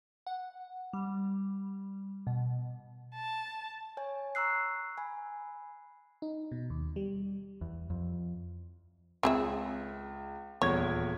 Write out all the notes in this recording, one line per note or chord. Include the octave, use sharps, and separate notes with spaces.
F#5
G3
B2
A5
C#5 G#5
A#5 C#6 E6 F#6 C7
G#5 B5
D#4
B2
D#2
G3
E2
F2
C#2 C4 G#4 E5
D#1 E2 C#5 G#6